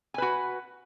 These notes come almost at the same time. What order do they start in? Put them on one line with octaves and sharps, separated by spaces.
G#5 B4 F#4